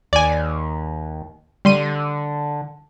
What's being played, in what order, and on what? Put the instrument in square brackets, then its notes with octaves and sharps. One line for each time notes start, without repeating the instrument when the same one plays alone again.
[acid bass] D#2 [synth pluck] D5 G#5
[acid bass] D3 [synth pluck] G3 C6 D#7